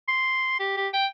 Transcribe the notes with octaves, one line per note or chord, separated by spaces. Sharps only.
C6
G4
G4
G5